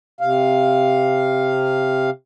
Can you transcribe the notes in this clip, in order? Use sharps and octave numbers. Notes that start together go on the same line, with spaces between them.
C3 F5